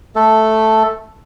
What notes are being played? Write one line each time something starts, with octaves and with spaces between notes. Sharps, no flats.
A3 A4